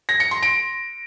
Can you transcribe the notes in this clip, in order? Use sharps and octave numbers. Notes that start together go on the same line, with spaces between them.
A#6
C#7
C6
D7